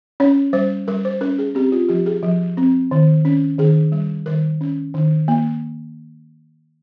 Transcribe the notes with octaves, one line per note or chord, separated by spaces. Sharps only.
C#4 C#5
G3 C5
G3 A#4
C5
C#4 A#4
G#4
C4 G4
F4
F3 G4
G#4
F3
C4
D#3
C#4
D#3 G#4
G3
D#3 A#4
C#4
D#3
A#3